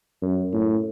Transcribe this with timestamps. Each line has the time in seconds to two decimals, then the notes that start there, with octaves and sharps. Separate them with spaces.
0.22 F#2
0.54 A2